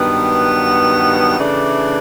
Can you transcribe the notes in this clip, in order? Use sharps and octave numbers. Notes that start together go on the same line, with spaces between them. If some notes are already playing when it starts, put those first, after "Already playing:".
Already playing: G2 D#3 F#3 B3
C#3 E3 A3 D4